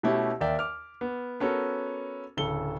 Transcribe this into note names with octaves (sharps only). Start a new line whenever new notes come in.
B2 A3 C#4 E4 G4
D#2 A#4 D5 E5 G5
D6 F6
B3
B3 C#4 F#4 A4 A#4
D1 C#3 A4 G7